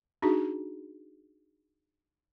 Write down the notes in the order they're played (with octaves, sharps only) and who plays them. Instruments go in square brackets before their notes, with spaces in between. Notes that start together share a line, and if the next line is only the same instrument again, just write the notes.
[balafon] D4 D#4 F#4 G#4